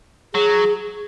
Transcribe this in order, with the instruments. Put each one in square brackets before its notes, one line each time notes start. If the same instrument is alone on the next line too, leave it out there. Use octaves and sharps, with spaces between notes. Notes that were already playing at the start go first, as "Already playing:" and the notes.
[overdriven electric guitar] F#3 [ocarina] G#4